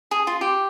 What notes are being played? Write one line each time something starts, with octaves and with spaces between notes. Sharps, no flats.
G#4
F4
G4